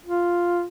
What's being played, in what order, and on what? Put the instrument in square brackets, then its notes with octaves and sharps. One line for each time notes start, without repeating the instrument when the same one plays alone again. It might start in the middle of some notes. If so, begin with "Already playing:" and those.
[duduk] F4